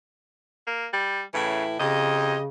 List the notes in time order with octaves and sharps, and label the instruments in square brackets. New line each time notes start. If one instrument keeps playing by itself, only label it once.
[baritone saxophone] A#3
G3
[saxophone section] A2 E3 E4 [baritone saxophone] C#3
[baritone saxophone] F2 [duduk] C#3 [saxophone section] G4 D#5